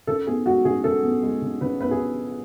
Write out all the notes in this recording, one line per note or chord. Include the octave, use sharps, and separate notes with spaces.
C#3 A4
B3 G#4
G#3 F#4
C#3 G#4
C#3 A4
B3
G#3
C#3
C#3 B4
B3 B4
G#4